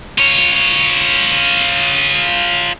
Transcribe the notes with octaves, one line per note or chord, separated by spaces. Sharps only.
F4 C#5